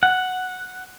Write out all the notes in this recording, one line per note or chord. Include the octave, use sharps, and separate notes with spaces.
F#5